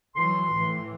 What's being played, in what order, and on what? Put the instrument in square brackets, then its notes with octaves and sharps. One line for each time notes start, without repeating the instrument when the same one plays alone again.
[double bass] E3 F#3 [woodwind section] C6
[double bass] A2 E3